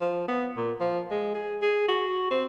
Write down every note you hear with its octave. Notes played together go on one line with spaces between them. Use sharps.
F3
B3
A#2
F3
G#3
G#4
G#4
F#4
C4